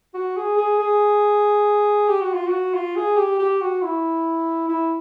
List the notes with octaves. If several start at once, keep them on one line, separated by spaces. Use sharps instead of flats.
F#4
G#4
G#4
G#4
G4
F#4
F4
F#4
F4
G#4
G4
G4
F#4
E4
E4